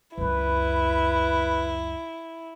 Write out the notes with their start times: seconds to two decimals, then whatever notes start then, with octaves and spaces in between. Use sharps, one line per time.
0.18 C#2 F#2 E4 B4